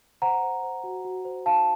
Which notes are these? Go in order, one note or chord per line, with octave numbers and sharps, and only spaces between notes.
C5 F#5 A#5
C5
C5
F#4
F#4
C5
D#4 F5 A5